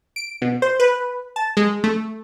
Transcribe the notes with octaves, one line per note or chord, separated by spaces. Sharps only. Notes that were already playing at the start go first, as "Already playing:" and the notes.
D7
B2
C5
B4
A5
G#3
A3